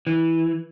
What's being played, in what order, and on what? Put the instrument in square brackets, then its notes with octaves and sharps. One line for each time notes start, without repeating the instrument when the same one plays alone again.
[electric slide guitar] E3